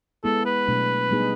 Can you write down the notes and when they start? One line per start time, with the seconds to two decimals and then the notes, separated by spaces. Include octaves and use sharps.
0.24 G#3 B3 E4 G#4 A4
0.45 B4
0.68 B2 F#3 A3 D4
1.11 G3 B3 D#4 G#4